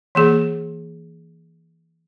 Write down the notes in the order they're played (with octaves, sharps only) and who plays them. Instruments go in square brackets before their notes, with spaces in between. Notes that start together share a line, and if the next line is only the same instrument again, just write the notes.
[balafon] E3 A#3 G#4